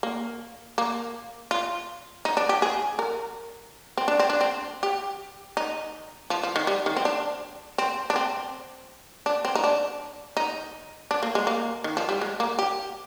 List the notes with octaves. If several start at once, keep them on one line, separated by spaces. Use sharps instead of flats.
A#3
A#3
F4
D#4
D4
G4
G#4
A#4
C4
D4
C4
D4
C4
G4
D#4
F3
F3
D#3
G3
D#3
C4
D4
C4
D4
C4
D4
C4
D#4
D4
D#4
D4
A#3
G#3
A#3
D#3
F3
G3
G#3
A#3
G4